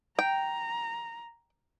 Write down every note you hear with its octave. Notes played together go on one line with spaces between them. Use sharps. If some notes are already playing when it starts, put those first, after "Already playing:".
G5 A#5